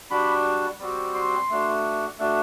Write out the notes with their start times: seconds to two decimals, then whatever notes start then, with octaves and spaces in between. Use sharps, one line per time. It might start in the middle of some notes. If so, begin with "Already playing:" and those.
0.11 G3 D4 F#4 B5
0.80 G3 C4 F#4
1.15 C6
1.49 A3 D4 F#4
2.18 A3 D4 F#4